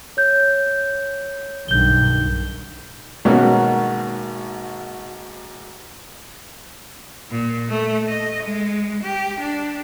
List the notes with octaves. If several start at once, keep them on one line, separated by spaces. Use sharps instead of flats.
C#5 G6
B1 G2 D#3 G6 G7
G#1 B2 A#3 C#4 F#4
A#2
A3
D#5
G#3
G4
D4